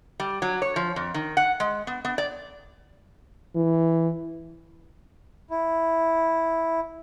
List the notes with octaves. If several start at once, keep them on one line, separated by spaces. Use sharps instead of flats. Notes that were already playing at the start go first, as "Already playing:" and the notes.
G3
F#3
C#5
F3
F2
D#3
F#5
G#3
B3
B3
D5
E3
E4